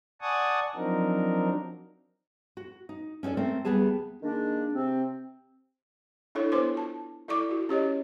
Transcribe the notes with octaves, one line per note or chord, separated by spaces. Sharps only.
D5 F#5 G#5 A5 C#6 D#6
F3 F#3 C4 D4 D#4 A#4
F#4
D#4
C#4 D#4 F#4 A4 D5
A3 C4 A#4
D2 G3 B3 G4 G#4 A5
D#3 G#3 A#3 D4
C3 C4
D4 E4 A4 C#5
B3 B4 C5 C6 D6
F4 A5
E4 A4 D5 C#6 D6
E4 F#4
C#4 G4 C#5 D#5